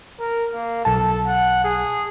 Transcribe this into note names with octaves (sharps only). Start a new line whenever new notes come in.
A#4
A#3
B1 A4 A5
F#5
G#4